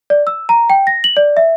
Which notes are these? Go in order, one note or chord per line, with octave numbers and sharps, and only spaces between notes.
D5
E6
A#5
G5
A#6
F#7
D5
E5